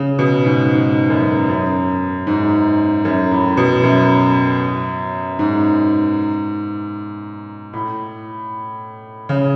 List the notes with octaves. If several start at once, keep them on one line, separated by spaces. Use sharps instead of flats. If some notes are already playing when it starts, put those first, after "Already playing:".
Already playing: C#3
B2
G#2
G#2
F#2
F#2
G#2
F#2
A2
B2
F#2
G#2
A2
C#3